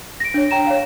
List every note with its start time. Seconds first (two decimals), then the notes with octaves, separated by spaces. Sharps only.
0.20 A#6 D7
0.34 D4 C#5
0.51 G5 A#5 E7
0.67 C#5 F5